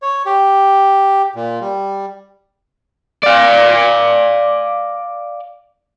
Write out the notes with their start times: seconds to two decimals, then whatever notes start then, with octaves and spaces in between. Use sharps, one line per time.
0.02 C#5
0.26 G4
1.35 A#2
1.61 G3
3.24 D5 F5